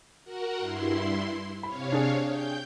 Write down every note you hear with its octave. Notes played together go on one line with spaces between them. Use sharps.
F#4 A#4 F#5
G2 E4 C6
C3 C#5 F5 B5
D4 G#4
G5 G6